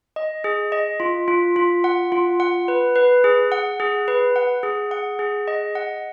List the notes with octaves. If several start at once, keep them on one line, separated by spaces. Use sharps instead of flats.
D#5
G#4
D#5
F4
F4
F4
F#5
F4
F#5
B4
B4
G#4
F#5
G#4
B4
F#5
G#4
F#5
G#4
D#5
F#5